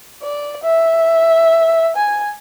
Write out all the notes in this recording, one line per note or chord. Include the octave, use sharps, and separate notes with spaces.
D5
E5
G#5